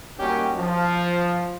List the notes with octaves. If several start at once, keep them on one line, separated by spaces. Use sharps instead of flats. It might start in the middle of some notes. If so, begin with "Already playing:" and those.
G3 A#3 C#4 D#4 F#4 G4
F3